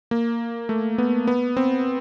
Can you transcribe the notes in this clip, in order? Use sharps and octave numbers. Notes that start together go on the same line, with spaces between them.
A#3
A3
B3
B3
C4